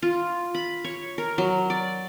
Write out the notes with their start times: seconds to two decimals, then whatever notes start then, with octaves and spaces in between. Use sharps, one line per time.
0.02 F4
0.55 B5
0.84 C#5
1.18 A#4
1.38 F#3
1.70 D5